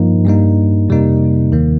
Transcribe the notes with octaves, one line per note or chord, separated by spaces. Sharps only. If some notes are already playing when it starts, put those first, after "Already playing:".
Already playing: G2 F3 A#3 D#4
G2 G3 A#3 D#4
F2 C3 G3 A#3 D#4
D#2 D#3 A#3